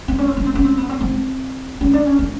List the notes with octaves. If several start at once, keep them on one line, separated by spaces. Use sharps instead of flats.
C4
C#4
C4
C#4
C4
C#4
C4
B3
C4
C4
C#4
D4
C#4
D4